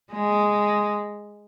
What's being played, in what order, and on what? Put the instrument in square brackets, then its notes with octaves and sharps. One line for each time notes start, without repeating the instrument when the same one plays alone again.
[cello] G#3